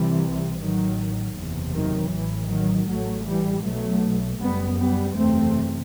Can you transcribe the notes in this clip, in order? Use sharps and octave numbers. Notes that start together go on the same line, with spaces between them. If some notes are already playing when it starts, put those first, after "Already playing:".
Already playing: C2 C3 E3 G3
A1 A2 D#3 F#3
F#1 E2 C3
D#3 F#3
A1 A2 E3
D#3 F#3
A1 A2 F#3 A3
E3 G3
B1 B2 F#3 A3
F#1 F#2 G3 B3
G3 B3
F#1 E2 C3 A3 C4